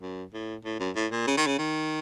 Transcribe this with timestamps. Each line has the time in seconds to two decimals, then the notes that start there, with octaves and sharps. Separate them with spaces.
0.02 F#2
0.34 A2
0.65 A2
0.80 F#2
0.96 A2
1.12 A#2
1.27 C#3
1.37 D#3
1.47 C#3
1.58 D#3